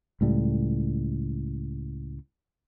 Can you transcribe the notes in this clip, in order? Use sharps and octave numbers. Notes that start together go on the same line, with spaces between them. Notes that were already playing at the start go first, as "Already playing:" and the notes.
C#2 A2 G3